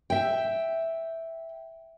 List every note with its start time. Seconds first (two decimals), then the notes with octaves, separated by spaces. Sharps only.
0.10 E5 G5